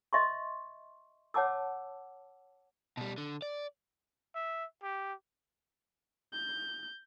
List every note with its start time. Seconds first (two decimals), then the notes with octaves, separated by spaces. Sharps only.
0.13 D#5 E5 C6 C#6
1.34 C#5 F#5 A5 D6 E6
2.97 B2 G3
3.18 D3
3.42 D5
4.35 E5
4.83 G4
6.33 G6